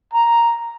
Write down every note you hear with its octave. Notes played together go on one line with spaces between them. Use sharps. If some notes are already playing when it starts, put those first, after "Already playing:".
A#5